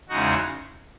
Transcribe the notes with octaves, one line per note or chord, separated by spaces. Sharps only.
E2 C#3 G#3 D#4 F#4